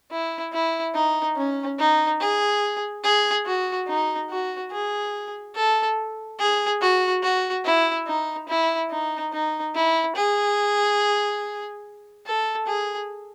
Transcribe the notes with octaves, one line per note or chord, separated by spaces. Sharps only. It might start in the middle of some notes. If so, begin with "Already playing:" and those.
E4
E4
D#4
C#4
D#4
G#4
G#4
F#4
D#4
F#4
G#4
A4
G#4
F#4
F#4
E4
D#4
E4
D#4
D#4
E4
G#4
A4
G#4